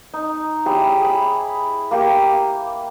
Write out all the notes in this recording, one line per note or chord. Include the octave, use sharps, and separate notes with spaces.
D#4
E4 G4 G#4 C#5
G#4 B5
A#3 G4